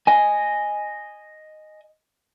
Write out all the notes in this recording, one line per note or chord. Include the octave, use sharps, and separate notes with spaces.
D#5 G#5